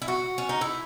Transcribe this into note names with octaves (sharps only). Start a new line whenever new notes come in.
E4
F#4
C#4
D#4
E4